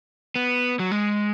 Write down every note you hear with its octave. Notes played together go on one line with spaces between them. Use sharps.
B3
F#3
G#3